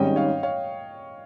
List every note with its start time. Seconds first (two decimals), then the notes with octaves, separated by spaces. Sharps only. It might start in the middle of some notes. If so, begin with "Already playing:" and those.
Already playing: G#1 G#2 D#3 G3 C#4 D#5 G5
0.16 C#5 F5
0.43 C#5 F5